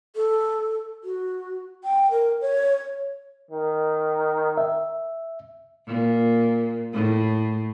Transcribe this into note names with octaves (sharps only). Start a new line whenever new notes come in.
A4
F#4
G5
A#4
C#5
D#3
E5
A#2
A2